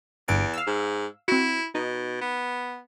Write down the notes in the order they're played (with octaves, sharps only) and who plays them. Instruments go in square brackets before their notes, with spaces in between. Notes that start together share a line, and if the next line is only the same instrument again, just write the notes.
[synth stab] G1 G2 D7 [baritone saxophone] E2
[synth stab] F5 E6
[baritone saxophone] G#2
[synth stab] C4 F#4 [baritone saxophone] E4
[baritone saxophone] B2 [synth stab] D#4
[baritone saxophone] B3